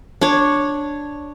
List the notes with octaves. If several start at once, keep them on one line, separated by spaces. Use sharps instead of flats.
D4 C#5